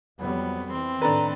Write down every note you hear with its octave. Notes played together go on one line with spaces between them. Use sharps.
F2 F#3 G3 B3
E3 C4
A2 D#3 D4 A4 B4 A#5